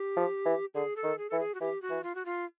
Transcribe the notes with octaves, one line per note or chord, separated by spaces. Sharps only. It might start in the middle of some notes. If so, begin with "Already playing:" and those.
Already playing: G4
F3
E3
D3 G#4
A4
D#3
G#4
E3 A4
G#4
F#4
E3 G4
F#4
E3
F4
F#4
F4